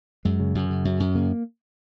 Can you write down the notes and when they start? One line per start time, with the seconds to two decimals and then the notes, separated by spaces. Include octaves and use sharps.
0.25 F#2 G#3
0.40 C#3
0.55 F#2
0.70 C#3
0.85 F#2
1.00 F#2
1.15 C#3 A#3